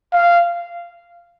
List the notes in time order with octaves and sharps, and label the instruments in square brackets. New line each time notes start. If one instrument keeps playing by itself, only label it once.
[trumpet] F5